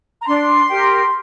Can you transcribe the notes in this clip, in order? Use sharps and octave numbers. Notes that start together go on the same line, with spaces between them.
A#5
D4 C6
G4 A#4